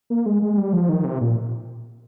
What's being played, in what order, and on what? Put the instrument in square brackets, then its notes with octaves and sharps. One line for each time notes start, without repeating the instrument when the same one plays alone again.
[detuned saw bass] A#3
G#3
G#3
G3
F3
D#3
C3
A#2